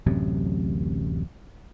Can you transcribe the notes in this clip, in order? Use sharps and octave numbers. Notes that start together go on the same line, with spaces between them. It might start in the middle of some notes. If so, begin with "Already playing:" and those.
D1 A1 F#2 C3